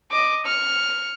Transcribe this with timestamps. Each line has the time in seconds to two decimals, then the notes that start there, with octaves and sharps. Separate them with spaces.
0.12 D#5 D6
0.46 F6 C#7